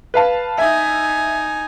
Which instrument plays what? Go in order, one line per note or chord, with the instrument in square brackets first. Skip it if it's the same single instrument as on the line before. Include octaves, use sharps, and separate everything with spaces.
[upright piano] B4 F5 A5
[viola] D#4 G#5 [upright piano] E5